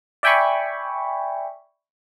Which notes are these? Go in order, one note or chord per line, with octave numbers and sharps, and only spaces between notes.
D5 E5 G5 G#5 B5 C#6